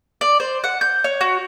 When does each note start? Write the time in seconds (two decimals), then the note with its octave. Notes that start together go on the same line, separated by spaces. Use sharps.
0.21 D5
0.40 C5
0.64 F#5
0.81 G6
1.04 C#5
1.21 F#4